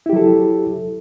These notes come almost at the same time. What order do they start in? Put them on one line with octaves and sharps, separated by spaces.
E4 G4 F#3 A4